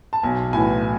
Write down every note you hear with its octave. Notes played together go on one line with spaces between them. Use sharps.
A5
B1 G#5
A2 E3 G#5